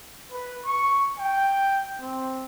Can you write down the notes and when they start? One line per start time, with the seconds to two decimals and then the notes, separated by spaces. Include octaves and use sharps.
0.32 B4
0.65 C#6
1.18 G5
2.00 C4